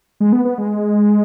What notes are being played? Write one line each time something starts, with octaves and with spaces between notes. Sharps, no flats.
G#3
B3
B3
G#3